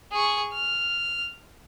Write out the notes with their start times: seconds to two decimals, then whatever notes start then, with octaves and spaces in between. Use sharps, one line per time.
0.12 G#4 C#6
0.53 F6